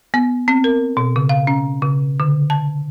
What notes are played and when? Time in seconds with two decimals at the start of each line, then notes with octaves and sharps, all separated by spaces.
0.14 B3
0.48 C4
0.64 A#4
0.97 B2
1.16 C#3
1.29 F5
1.47 C#4
1.82 C#3
2.20 D3
2.50 A5